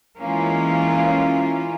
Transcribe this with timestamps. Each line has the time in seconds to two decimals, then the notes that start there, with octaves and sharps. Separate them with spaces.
0.21 E3 G#3 A#3 C#4 F4